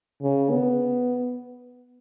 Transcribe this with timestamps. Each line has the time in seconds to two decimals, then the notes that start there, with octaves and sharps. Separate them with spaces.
0.22 C#3
0.51 B3